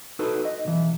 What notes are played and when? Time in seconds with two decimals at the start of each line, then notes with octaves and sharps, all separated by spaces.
0.19 D#4 F#4 A4 B4
0.45 D#5
0.65 B1 E3